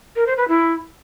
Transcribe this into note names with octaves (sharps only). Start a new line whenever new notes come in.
A#4
C5
B4
E4